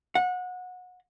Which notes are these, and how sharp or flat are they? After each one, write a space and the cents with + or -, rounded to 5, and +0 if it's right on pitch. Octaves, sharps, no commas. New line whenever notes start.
F#5 -25